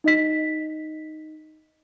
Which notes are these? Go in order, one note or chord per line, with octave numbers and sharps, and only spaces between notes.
D#4 D#5 B6